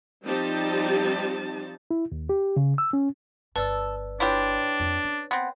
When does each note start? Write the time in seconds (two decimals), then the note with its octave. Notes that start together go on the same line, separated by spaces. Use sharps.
0.24 F3 G3 C4 D#4 G4 A5
1.91 E4
2.12 D#2
2.29 G4
2.56 C#3
2.78 E6
2.93 C#4
3.56 G1 A4 B4 D5 E6
4.20 D4 E4 F4 G4 B4 C#5
4.80 F2
5.03 C#4
5.31 B3 C4